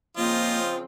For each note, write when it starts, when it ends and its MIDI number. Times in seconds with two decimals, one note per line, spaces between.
0.17 0.84 49
0.17 0.84 53
0.17 0.59 58
0.17 0.84 60
0.17 0.77 65
0.17 0.77 75